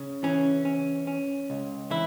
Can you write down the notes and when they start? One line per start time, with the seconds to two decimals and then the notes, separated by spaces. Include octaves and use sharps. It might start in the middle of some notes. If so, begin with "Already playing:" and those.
Already playing: C#3
0.23 E3 C#4
0.65 C#4
1.07 C#4
1.50 C#2
1.90 E3 E4